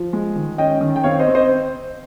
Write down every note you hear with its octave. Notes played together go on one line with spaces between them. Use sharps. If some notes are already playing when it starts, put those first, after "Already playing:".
Already playing: F3
G#3
D#3
C#4 D#5 G5
D#3
G5
C4 C#5 F5
C5 D#5
C4
C5 D#5